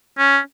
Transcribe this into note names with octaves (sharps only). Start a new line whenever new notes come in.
C#4